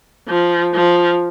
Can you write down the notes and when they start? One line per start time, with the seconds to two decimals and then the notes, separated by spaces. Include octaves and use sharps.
0.29 F3
0.75 F3